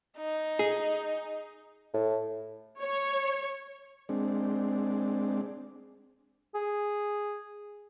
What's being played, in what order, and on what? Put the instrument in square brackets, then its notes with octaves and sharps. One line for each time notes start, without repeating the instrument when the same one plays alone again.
[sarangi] D#4
[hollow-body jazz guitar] G#4
[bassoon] A2
[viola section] C#5
[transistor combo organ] G#3 C4 D4
[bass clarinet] G#4